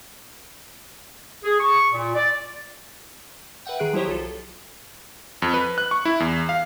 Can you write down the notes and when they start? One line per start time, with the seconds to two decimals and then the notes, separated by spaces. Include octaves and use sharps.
1.44 G#4
1.60 C#6
1.92 A#2
2.15 D5
3.65 B4 E5 F#5 G5
3.79 D#3 G#4 F#6 D7
3.93 F3 F#3 E4 G4 C5 C#5
4.07 B1 F4 A4
5.42 F2
5.54 B4
5.78 F#6
5.91 C#6
6.05 E4
6.20 E2
6.49 F5